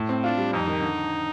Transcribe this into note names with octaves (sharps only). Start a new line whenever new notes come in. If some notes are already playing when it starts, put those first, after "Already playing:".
Already playing: A2
C4
D4 F4
G3
F2 D#4
D#3
D3